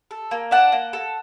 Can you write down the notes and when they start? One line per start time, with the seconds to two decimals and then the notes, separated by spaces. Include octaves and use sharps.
0.11 A4
0.31 A#3
0.51 D4 F#5 A5
0.72 A#3
0.93 A4